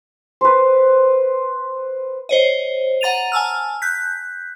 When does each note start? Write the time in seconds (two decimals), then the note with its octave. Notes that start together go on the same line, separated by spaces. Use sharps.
0.41 B4 C5
2.29 C5 C#5 D#5
3.01 F#5 A#5 A6 D#7 F7
3.32 G#5 A5 E6 F6
3.82 F#6 G6 B6